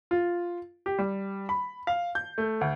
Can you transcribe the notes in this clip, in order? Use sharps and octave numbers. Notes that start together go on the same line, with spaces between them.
F4
G4
G3
B5
F5
G6
A3
D2